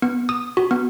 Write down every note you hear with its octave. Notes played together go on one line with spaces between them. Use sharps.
B3
D#6
F#4
B3